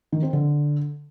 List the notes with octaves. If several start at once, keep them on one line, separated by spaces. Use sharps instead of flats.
D#3
C4
D3